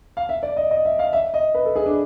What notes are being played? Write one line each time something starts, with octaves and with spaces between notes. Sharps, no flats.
F5
E5
D5
D#5
D#5
E5
F5
E5
D#5
B4
A4
G#4
D4